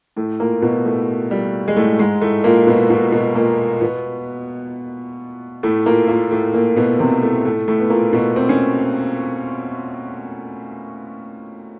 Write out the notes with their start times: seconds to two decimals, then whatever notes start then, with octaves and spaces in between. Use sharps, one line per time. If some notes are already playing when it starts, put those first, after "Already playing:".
0.16 A2 A3
0.40 A#2 A#3
0.62 B2 B3
0.85 A2 A3
1.31 G3
1.68 G#3
1.76 A2 A3
1.99 G#2 G#3
2.21 A2 A3
2.44 A#2 A#3
2.67 B2 B3
2.90 B2 B3
3.12 B2 B3
3.35 A#2 A#3
3.81 B2 B3
5.63 A2 A3
5.86 A#2 A#3
6.08 A#2 A#3
6.31 A2 A3
6.54 A#2 A#3
6.76 B2 B3
6.99 C3 C4
7.22 A2 A3
7.45 A2 A3
7.68 A2 A3
7.80 B3
7.90 A#2 A#3
8.13 B2 B3
8.36 C4
8.49 C#4